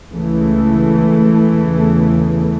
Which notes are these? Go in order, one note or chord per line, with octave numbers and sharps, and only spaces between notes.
C#2 C#3 E3 A3
E2 C#3